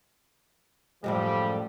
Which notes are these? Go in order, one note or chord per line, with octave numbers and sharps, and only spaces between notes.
F#2 A2 F3 G3 G#3